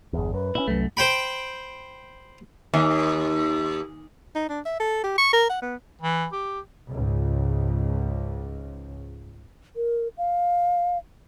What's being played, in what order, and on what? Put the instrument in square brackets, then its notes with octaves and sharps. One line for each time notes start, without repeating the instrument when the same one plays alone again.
[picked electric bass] G1 E2 [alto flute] G#4
[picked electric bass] F#2 [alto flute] B4
[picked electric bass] A#2 C#4 [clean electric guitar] E4
[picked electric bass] C2 [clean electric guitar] F#2 A3
[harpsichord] C5 G5 B5
[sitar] D#2
[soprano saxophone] D#4
D4
E5
A4
G4
C#6
A#4
F#5
B3
[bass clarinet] E3
G4
[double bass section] C#2 G#2
[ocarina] A#4
F5